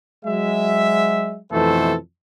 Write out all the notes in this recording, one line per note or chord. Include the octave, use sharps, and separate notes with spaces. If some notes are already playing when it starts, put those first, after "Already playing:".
F#3 G#3 E5
F2 B2 E3 A3 A4 C5